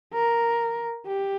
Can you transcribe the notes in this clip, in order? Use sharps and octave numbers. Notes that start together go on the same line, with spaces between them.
A#4
G4